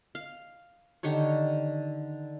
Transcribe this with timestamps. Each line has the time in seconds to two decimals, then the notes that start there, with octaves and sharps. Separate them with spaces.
0.15 F5
1.03 D3 D#3 G4 C#5